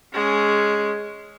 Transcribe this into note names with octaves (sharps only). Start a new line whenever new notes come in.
G#3 C#4